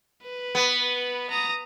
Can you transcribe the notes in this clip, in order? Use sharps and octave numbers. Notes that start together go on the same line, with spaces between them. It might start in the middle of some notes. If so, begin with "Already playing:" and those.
B4
B3
A#5 D#6